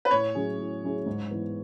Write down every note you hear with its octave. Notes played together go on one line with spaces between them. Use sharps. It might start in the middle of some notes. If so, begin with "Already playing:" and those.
B4
A2 C#5
F#3 C#4 E4 G#4
A2
F#3 C#4 E4 G#4
G#2
E3 B3